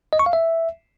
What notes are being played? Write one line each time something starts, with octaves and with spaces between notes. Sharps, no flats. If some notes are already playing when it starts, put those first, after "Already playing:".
D#5
C#6
F5
E5